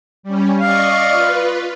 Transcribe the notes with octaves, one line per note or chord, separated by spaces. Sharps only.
G3 C#4
D5 D#5 F5 C#6
F4 B4